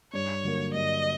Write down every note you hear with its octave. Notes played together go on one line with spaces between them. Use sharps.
G2 C#5
D3 F#3 A#3
G2 D#5